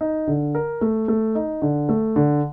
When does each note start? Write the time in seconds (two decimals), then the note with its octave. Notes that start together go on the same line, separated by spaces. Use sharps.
0.01 D#4
0.27 D3
0.55 A#4
0.81 A3
1.08 A3
1.35 D#4
1.62 D3
1.89 A3
2.16 D3